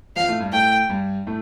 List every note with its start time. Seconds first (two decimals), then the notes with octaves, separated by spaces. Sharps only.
0.16 F2 F3 F5
0.28 A2 A3
0.40 G2 G3
0.52 A2 A3 G5
0.89 G2 G3
1.27 A2 A3